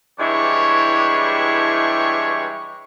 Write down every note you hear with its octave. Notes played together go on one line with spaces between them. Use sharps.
G2 E3 G#3 E4 G4 C#5